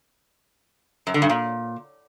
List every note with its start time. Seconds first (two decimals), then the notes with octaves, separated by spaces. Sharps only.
1.07 F#2
1.14 D3
1.22 G2
1.29 A#2